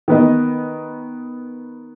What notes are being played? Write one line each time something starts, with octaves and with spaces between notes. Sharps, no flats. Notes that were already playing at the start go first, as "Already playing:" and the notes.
D#3 B3 D#5